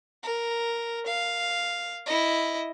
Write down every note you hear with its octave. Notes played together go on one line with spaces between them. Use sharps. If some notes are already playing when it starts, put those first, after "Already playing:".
A#4
F5
E4 D#5